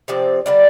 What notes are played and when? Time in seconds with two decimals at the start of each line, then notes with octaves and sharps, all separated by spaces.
0.08 C3 F3 C4 D5
0.46 D3 G3 A#3 D4 D5